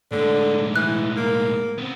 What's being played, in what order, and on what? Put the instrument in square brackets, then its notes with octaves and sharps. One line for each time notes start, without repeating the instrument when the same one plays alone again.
[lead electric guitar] A2 G#3 [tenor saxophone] D3
[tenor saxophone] E3 [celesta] F#6
[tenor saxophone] A#3
[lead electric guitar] B3 C4